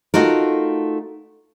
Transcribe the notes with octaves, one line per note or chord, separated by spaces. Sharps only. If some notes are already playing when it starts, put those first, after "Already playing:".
A3 D#4 F4 F#4 A#4